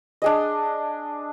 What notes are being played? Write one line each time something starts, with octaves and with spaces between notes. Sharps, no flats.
D4 G#4 D#5